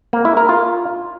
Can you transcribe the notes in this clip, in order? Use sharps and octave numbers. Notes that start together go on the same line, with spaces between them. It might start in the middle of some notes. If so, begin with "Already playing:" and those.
A#3
E4
A#4
F4